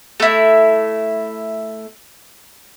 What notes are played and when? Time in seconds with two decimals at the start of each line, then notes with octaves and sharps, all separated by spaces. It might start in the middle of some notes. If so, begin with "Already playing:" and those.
0.20 A3 E4